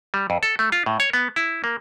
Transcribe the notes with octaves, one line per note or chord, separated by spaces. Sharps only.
G3
F2
A4
A3
F4
A2
C#5
B3
E4
A#3